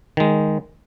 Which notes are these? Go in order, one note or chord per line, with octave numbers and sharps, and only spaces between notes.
D#3 G#3